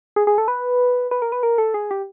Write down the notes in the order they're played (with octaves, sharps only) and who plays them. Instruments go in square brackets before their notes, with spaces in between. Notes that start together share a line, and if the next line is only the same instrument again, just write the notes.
[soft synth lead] G#4
G#4
A4
B4
B4
A#4
B4
A#4
A4
G#4
G4